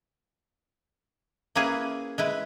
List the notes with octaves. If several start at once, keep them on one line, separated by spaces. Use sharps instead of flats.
A#3 C#4 E4 G#4 B4
G#3 E4 B4